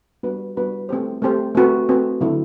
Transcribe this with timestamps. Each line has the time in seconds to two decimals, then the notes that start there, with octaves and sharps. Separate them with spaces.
0.23 G3 B3 D4 F#4 B4
0.57 G3 B3 D4 F#4 B4
0.89 A3 C4 G4 C5
1.22 A3 C4 G4 C5
1.55 A3 C4 F#4 B4
1.89 A3 C4 F#4 B4
2.21 D3 F#3 C4 E4 A4